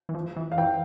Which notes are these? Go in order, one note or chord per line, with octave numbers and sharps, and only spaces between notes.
E3
F3
E3
F5
E3 G5